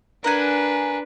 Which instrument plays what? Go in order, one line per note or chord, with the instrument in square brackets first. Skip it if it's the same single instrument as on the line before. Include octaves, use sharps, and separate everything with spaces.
[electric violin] D4 B4 [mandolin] A#4 F#5 G#5